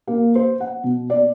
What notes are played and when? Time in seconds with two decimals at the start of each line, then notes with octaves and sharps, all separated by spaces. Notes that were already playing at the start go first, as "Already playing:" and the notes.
0.07 A#3
0.35 C5
0.60 F#5
0.84 B2
1.10 D5